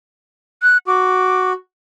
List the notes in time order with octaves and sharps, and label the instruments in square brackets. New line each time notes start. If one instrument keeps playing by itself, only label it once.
[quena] F#6
[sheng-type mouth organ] F#4 [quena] D6